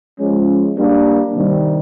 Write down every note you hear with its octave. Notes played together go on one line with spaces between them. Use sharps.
F3 G#3 C#4
G3 A#3 D4
C3 D#3 G3